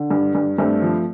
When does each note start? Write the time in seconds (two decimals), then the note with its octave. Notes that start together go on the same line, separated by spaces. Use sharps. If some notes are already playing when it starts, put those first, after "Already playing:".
Already playing: D3
0.11 G2
0.35 G2
0.58 G2 A3 C4
0.82 F3